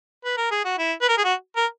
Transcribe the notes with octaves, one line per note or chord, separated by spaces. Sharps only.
B4
A#4
G#4
F#4
E4
B4
A#4
G#4
F#4
A#4